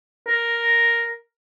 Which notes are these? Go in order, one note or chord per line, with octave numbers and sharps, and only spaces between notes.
A#4